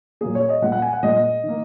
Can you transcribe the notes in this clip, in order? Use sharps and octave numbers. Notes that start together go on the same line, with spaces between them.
A#2 F#3 A#3 G#4
C#5
D#5
A#2 G#3 F#5
F#5
G#5
F#5
A#2 G#3 D#5
D#3 A#3